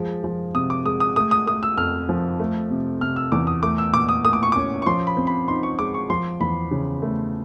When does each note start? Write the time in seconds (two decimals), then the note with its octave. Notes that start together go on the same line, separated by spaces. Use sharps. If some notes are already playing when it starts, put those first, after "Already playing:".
Already playing: F3 G#3
0.24 F3
0.55 C3 D#6
0.70 D6
0.85 G#3 D#6
1.00 D#6
1.16 A3 D#6
1.31 D#6
1.47 A3 D#6
1.63 E6
1.77 F2 F6
2.09 F3
2.39 A3
2.71 C3
3.01 C3 F6
3.16 E6
3.32 E2 D6
3.47 D#6
3.63 A3 D6
3.78 E6
3.93 A#2 D6
4.09 D#6
4.25 A3 D#6
4.33 D6
4.43 C#6
4.52 C#4 D6
4.82 C#6
4.86 F3 C6
5.07 B5
5.17 C4
5.27 B5
5.48 D#4 C6
5.63 C#6
5.79 G#3 D6
5.94 C#6
6.10 F3 C6
6.40 E2 B5
6.71 C#3
7.02 A3